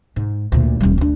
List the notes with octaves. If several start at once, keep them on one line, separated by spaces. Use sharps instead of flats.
G#2
D2 A#2
D#1 G3
D2 D4